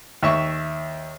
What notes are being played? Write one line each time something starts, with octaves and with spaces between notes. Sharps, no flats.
D#2 E5 C#6